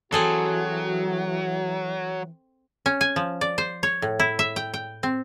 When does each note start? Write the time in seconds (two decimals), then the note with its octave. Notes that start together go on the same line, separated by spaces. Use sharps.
0.12 E3 F#3 C4 F#4 G#4 A4
2.86 C#4
3.01 G#5
3.16 F3
3.41 D5
3.58 C5
3.83 C#5
4.02 A2
4.19 E4
4.39 E5
4.56 G5
4.74 G5
5.03 C4